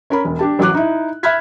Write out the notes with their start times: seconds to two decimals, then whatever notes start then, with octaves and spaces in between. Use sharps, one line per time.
0.10 C#4 A#4 B5
0.25 E1
0.39 D4 G4 A5
0.59 A1 F#3 D6 F#6
0.74 D#4 E4
1.23 E5 B5 F6 F#6 G#6 B6